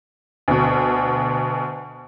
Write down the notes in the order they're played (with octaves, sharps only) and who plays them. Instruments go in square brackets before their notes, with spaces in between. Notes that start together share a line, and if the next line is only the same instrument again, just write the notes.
[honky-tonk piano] D2 B2